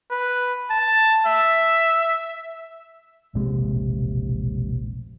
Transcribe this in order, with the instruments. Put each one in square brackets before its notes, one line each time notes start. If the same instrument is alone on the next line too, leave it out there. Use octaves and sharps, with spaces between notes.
[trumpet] B4
A5
E5
[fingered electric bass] E1 A#1 C3 G#3